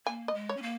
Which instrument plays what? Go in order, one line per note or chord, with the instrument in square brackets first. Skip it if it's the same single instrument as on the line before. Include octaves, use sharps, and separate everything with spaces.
[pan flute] A#3 [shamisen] G#5
[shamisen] D#5
[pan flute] G#3
[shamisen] C#5
[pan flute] C#4
A#3